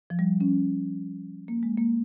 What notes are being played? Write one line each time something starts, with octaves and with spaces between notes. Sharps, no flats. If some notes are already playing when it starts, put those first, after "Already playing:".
F3
G3
C#4
A#3
G#3
A#3